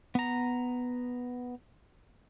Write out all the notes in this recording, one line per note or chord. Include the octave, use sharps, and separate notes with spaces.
B3 A#5